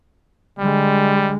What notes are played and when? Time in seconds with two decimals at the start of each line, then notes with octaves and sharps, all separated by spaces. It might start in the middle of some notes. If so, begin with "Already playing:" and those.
0.59 D3 G3 G#3